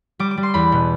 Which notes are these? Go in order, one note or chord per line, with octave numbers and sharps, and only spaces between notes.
G3 D6
D6
G3
C6
E2 B5
B2